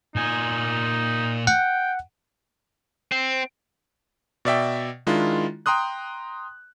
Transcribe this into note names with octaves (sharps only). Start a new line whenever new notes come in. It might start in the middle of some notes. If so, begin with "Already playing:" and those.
A#2 D#4 G#5
F#5 G5
C4
B2 D5 E5 G5
D#3 G#3 D4 E4 F4
G5 A#5 C6 D#6 F#6